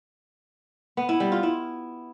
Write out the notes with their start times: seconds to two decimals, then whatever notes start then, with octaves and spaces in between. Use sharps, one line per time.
0.97 B3
1.09 E4
1.20 G3
1.32 F4
1.43 E4